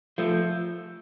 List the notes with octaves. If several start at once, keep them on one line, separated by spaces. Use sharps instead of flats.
F3 A3